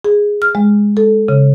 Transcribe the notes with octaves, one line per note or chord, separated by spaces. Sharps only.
G#4
F6
G#3
A4
C#3